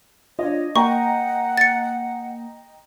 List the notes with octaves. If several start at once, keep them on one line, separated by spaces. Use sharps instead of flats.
D4 F4 C#5 D#5
A#3 D#5 F#5 G5 A#5 C#6
A6 C#7